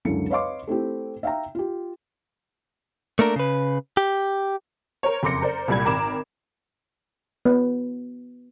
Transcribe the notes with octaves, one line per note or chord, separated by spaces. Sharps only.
C#2 F#2 D3 E4 A4 C#7
B4 C#5 D#5 F5 C6 D6
A3 C4 E4 G4
E5 F5 G5 A#5
F4 G4
A3 A#3 D4 A#4
C#3 B4
G4
A#4 C5 C#5
F#1 F2 C6 D6 A#6 C#7
A#4 C5 D5
C2 A#2 G3 B5 G#6
G#1 A#4 A#5 B5 D6 E7
B3